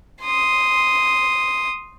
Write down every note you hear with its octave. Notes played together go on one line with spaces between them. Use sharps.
C6 D#6